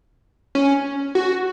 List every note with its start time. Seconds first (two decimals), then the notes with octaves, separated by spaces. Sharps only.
0.55 C#4
1.15 F#4